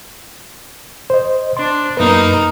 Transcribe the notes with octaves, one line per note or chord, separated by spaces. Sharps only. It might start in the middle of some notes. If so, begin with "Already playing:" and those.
C5 D#5
D4 C6
F#2 A#3 D#4 B4